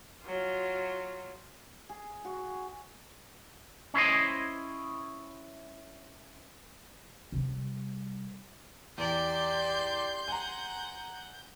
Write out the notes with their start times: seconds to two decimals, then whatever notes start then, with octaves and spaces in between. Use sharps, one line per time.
0.23 F#3 F4
1.89 G#4
2.25 F#4
3.94 C#4 E4 C5 D#5
7.32 C3 G3
8.98 E2 G4 D5 C6 G6
10.28 F#5 G#5 A#5